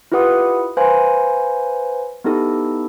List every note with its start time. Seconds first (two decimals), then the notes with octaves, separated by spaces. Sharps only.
0.12 E4 F4 G4 B4 F#5 D#6
0.77 B4 C5 F5 G#5 C6
2.24 B3 D#4 E4 G4 A4